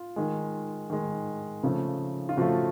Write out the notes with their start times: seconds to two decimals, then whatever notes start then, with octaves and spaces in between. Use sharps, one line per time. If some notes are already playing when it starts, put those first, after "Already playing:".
Already playing: F4
0.16 D#3 G#3
0.90 D#3 G#3
1.63 C#3 F3 A3
2.29 F4
2.37 C#3 F3 A3 F#4